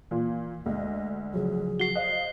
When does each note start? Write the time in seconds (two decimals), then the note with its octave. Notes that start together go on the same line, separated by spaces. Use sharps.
0.11 A#2 E3 F4
0.66 D2 G#3 D#5
1.34 C#3 F3 F#3 G#4
1.80 F#4 C7 G7
1.95 C5 D#5 F5 F#6